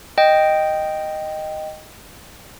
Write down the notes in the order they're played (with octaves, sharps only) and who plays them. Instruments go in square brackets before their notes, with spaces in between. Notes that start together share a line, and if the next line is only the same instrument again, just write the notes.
[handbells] D#5 G5